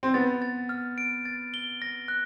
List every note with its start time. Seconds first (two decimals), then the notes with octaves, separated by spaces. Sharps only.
0.03 C4
0.14 B3 A6
0.42 A6
0.69 F6
0.98 D7
1.25 A6
1.54 G7
1.82 A#6
2.08 F#6